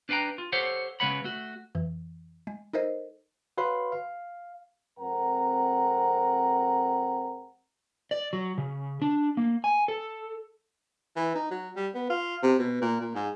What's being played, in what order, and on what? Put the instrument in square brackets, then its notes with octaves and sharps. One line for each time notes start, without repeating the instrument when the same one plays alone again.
[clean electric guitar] D4 B4 F5 G5 A#5
F4
G4 A4 C5 C#5 F5 F#5
C#3 G#3 B4 C#5 F#5 B5
A3 F#4
[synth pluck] F2 E3
G#3
D#4 A4 A#4 C5 D#5
[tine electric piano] F#4 B4 C#5 F5 B5 C6
F5
[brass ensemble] F2 G#3 C4 A#4 F#5 A#5
[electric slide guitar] D5
F#3
C#3
D4
A#3
G#5
A4
[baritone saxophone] E3
D#4
F#3
G3
B3
F4
C3
B2
A#2
A#2
G#2